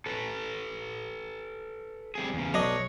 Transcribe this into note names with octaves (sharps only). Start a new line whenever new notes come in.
A4 B4
G3 C4 G#4
E2 C#3
B1 D4 C#5 D#5